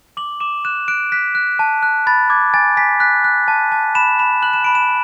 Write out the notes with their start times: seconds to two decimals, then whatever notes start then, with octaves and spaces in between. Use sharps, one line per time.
0.17 D6 F#7
0.40 D6 E7
0.65 F#6 E7
0.88 F#6 D7
1.12 F#6 B6
1.35 F#6
1.59 A5
1.83 F#6
2.07 B5 A6
2.30 D6 G#6
2.54 G#5 A6
2.77 G#5 B6
3.00 F#6 B6
3.24 F#6
3.48 A5
3.72 A5
3.95 B5 E7
4.19 B5 E7
4.42 F#6 F#7
4.53 E7
4.64 B5 D7
4.75 E7